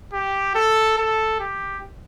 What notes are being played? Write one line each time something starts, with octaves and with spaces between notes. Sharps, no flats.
G4
A4
A4
G4